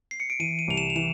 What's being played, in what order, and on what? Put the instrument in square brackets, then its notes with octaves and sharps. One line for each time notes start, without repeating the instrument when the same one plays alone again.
[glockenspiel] C7
C#7
D7
[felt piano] E3 [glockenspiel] D#7
[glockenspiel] D#7
[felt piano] C2 [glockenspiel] F7
[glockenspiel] E7
F7
[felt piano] E3 [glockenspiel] E7